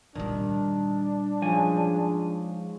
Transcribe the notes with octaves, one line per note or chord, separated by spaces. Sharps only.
A#2 D#3 G3 D4
G#2 F3 C#4 G#5